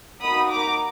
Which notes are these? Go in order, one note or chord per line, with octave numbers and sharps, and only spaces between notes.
A#3 D#4 F#4 B5 D#6
A#5 D6